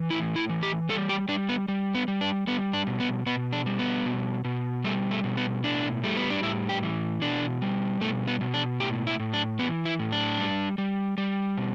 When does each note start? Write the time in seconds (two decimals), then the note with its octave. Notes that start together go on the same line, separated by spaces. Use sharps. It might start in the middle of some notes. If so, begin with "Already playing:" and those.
Already playing: E3
0.10 A2 E4
0.36 E4
0.49 E3
0.63 G4
0.89 G3 A4
1.09 G4
1.28 G3 D4
1.49 B3
1.68 G3
1.94 B3
2.08 G3
2.21 D4
2.47 G3 B3
2.73 D4
2.87 B2
3.00 B3
3.26 B2 B3
3.53 D4
3.66 G3
3.79 B3
4.06 B2
4.45 B2
4.84 G3 A3
5.11 A3
5.24 B2
5.37 B3
5.64 A2 D4
6.04 G3 A3
6.17 B3
6.30 D4
6.43 A2 E4
6.69 G4
6.83 E3
7.22 B2 D4
7.62 G3
8.01 B2 A3
8.28 B3
8.41 B2
8.54 D4
8.80 A2 G4
9.07 E4
9.20 A2
9.34 D4
9.59 E3 B3
9.85 E4
9.99 A2
10.12 D4
10.39 G3
10.78 G3
11.18 G3
11.57 B2